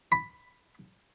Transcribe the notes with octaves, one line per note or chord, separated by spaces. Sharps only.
B5